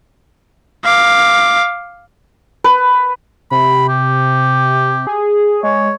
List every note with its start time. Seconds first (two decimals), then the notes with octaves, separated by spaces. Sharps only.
0.84 F5 D6
2.64 B4
3.51 C3 B5
3.89 G4
5.07 G#4
5.63 G#3 C#5